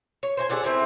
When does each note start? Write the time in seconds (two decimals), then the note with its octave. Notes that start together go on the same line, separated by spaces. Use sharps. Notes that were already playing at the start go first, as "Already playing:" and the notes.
0.23 C#5
0.37 C5 C#5 G#5
0.49 G#4 A4 D5 F#5
0.64 A3 C4 E4 C#5